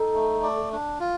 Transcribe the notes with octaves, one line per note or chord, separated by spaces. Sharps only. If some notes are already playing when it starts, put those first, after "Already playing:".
Already playing: D#4 A4
A3
D5
D4
F4